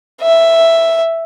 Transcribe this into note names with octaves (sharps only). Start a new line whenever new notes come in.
E5